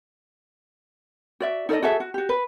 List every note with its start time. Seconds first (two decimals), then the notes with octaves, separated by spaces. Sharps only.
1.40 F#4 D5 E5
1.69 D#4 A4 D5 D#5
1.83 F#4 G#4 A4 E5
2.00 F#4
2.14 F#4 G4
2.29 B4